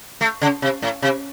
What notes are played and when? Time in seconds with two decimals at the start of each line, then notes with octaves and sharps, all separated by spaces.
0.21 A3
0.41 C#3
0.62 C3
0.82 A2
1.02 C3